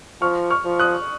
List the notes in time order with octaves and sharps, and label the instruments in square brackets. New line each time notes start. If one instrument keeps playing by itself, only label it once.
[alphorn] F3 [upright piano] C#6 F6
[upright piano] C#6 F6
[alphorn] F3
[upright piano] D#6 F#6